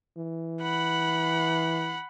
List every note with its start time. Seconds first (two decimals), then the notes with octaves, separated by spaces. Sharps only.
0.17 E3
0.62 F#5 B5